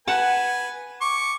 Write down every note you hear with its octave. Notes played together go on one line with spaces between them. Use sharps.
B4 F#5 G#5 A5
C#6 D6